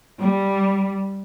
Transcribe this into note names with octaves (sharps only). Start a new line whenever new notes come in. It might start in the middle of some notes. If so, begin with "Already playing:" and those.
G3